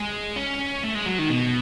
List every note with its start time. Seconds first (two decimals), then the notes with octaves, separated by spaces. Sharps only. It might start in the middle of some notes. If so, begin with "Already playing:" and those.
Already playing: G#3
0.36 C#4
0.84 A3
0.95 G#3
1.06 F#3
1.19 D#3
1.29 B2